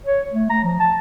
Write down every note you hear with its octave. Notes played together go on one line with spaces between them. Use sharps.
C#5
A3
A#5
F3
A5